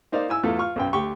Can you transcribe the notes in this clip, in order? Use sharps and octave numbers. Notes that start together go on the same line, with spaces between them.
A#3 D#4 C5 D5 F5
E4 G#5 E6
E2 A3 F4 A4
F4 C#6 F6
B1 F#2 G5
D2 G4 G5 C#6